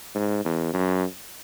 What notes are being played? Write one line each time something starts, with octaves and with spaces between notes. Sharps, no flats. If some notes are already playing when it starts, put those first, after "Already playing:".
G#2
E2
F#2